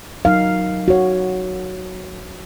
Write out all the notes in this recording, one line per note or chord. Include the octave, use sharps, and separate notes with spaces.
F#3 D#4 A#4 F5
F#4 C#5